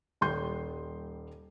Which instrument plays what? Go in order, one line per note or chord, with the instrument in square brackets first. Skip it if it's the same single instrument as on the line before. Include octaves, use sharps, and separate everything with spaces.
[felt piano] D#1 G3 C6 G6